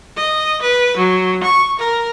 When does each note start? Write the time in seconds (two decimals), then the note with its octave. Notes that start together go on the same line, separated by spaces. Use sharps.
0.17 D#5
0.62 B4
0.97 F#3
1.43 C#6
1.79 A#4